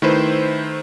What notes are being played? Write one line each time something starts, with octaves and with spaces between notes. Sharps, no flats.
D#3 A3 E4 B4 C5